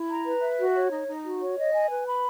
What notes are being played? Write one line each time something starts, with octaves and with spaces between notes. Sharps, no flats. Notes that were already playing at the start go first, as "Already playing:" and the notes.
Already playing: E4
A#5
B4
E5
F#4
C#5
D#4
D#4
F#4
C#5
D#5
G#5
B4
B5